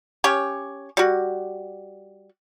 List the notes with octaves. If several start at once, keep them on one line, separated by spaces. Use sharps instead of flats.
C#4 G4 C#5
G3 F#4